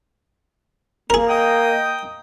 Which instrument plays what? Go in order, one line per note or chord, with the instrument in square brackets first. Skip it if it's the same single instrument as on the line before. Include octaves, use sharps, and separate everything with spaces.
[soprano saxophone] A#3 [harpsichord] G#4 A#4
[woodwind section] D#5 G5 D#6